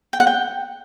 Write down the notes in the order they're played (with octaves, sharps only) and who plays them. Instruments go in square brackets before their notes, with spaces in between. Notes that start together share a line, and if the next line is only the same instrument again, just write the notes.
[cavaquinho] G5
F#5
G5